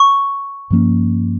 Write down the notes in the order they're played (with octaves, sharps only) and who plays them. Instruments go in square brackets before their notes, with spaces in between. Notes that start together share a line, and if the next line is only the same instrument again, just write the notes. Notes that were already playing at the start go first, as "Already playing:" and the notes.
Already playing: [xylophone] C#6
[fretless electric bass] G2 F3 A#3 C#4